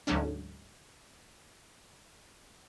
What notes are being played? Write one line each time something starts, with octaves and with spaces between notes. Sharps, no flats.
D2 G#2 F#3 A3 C#4 D4